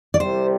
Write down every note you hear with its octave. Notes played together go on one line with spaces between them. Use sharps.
D5
C2 C3 G3 C5